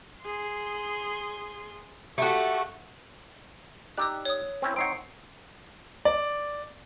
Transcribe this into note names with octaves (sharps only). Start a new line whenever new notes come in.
G#4 C6
A3 F#4 G4 A4
D#4 G4 D5 D#6 E6 F#6
C#5 D#6
C4 C#4 E4
C4 D#4 C#5 F#5 C7 D7
D5